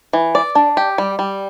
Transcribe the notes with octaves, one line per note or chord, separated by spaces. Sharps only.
E3
D5
D4
G4
G3
G3